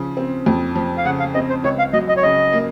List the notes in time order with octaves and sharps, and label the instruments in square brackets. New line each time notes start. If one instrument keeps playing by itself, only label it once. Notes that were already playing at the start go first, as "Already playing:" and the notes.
Already playing: [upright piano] C#3 F3
C4
F2
F3
[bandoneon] F5
[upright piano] C#3 [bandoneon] F#5
[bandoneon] F5
[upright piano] C4 [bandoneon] D#5
[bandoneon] C5
[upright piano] C#2 [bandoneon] C#5
[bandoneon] F5
[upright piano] F#3 [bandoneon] D#5
[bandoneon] D#5
C#5
[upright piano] C#3 [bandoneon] D#5
[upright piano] A#3